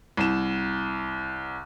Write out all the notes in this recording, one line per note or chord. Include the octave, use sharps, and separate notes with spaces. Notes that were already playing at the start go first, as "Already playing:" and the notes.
C2 E7